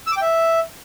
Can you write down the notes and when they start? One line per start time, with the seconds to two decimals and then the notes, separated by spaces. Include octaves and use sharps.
0.07 E6
0.12 D6
0.17 G5
0.22 E5